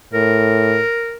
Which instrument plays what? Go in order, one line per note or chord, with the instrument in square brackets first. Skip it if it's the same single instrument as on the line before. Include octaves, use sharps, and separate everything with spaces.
[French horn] A2 [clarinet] A#4